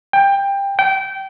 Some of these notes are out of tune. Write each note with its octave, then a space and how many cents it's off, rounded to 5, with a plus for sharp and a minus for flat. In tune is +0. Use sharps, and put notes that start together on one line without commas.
G5 +20
G5 -20